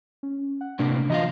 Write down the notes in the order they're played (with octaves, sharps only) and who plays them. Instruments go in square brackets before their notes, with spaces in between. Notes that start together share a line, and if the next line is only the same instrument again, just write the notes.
[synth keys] C#4
F#5
[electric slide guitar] A2 C3 A#3 [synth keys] D4
[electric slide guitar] E3 F4 F5 [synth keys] D#5 A#5 A#6